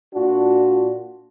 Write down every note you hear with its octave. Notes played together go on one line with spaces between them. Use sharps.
A#2 D4 F4 F#4